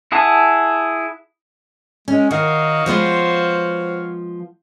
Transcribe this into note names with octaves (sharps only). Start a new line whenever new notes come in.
E4 G#4 F#5 A5
G#3 C#4
D#3 F#4 C#5 D#5 F5
F3 G#3 B3 C5